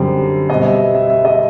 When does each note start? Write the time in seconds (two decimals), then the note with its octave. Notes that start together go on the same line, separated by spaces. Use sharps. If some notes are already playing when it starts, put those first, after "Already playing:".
Already playing: F#2 D3 G3 C4
0.50 B2 G3 C4 D#5
0.65 E5
0.95 E5
1.10 E5
1.25 D#5